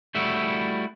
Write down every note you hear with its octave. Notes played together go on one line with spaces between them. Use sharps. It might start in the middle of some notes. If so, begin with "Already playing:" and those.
G3 A3 E4 F#4